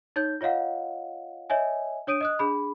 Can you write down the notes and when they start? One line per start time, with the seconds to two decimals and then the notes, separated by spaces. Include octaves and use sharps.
0.16 D#4 C#5 G6
0.41 F4 C#5 D#5 F5 F#5
1.50 C#5 D#5 E5 G#5
2.07 D4 C#5 D#6 D7 D#7
2.21 D#5 D#6 F#6
2.39 D4 G#4 B5